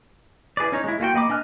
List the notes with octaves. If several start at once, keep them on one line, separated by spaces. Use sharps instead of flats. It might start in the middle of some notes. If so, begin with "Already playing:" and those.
E4 G#4 B4 D5
C#4 D#4 C#5
G#3 E4
A#3 F4 F#4 G5
A#3 D#5 B5 D6
D4 D#5 G#5 F6 F#6